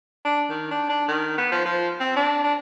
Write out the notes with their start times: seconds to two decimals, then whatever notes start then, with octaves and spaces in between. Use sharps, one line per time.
0.25 D4
0.49 D#3
0.71 D4
0.89 D4
1.08 D#3
1.38 B3
1.51 F3
1.65 F3
2.00 C4
2.16 D4
2.44 D4